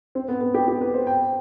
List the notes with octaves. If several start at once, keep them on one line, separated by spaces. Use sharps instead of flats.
C4
B3
B3
G4
G4
B4
C5
G5